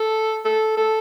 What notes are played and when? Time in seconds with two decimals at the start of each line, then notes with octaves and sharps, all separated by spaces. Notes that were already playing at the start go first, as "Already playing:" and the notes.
Already playing: A4
0.45 A4
0.77 A4